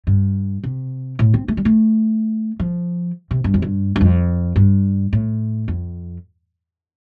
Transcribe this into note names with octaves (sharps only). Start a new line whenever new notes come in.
G2
C3
A2
C4
A3
G3
A3
F3
C3
G2
F2
G2
G2
F2
G2
A2
F2